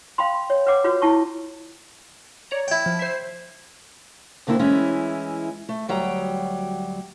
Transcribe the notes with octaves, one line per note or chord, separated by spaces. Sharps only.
F5 G5 B5 C6
C#5
B4 C#5 F#5 D6
F4 F#4 B4 C#5
E4 A5 C#6
C#5 D5 A#5
E4 G5
F3
C5 E5
D2 D3 A#3 C4 E4
E3 G#3 C#4 E4
A3
D2 F#3 G3 G5 A#5